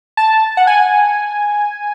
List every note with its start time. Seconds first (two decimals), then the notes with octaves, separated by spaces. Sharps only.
0.17 A5
0.57 F#5
0.67 G#5